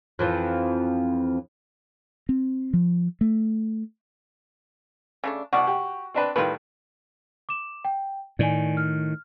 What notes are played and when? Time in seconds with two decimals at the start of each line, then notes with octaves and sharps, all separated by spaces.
0.19 F2 E3 F3
2.29 C4
2.73 F3
3.21 A3
5.24 C#3 A3 D4
5.53 C2 F#4 D5
5.67 G4
6.14 C4 D4 B4
6.36 A2 D#3 G3 F4 B4
7.49 D6 E7
7.85 G5
8.39 A2 D#3 D5 G#5
8.77 F6